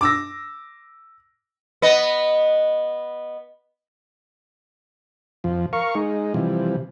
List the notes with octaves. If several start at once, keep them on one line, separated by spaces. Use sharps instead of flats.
D6 E6 A#6
B3 B4 D#5
F2 F3
A#4 F5 C#6
G#3 D#4
C3 E3 F3 G3